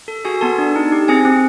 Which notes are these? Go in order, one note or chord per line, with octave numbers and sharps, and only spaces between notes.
A4
F#4 G#4 G#5
B3 A4 A5
D4
D#4
G4
C4 G#4 G#5
C4